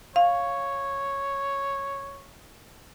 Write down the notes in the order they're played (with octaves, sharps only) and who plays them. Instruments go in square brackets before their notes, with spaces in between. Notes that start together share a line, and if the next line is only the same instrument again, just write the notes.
[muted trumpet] C#5 [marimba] F5